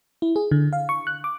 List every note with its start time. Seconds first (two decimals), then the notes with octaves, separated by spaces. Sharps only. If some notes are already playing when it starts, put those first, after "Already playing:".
0.22 E4
0.36 G#4
0.51 D3
0.73 F5
0.89 C#6
1.07 F#6
1.24 D6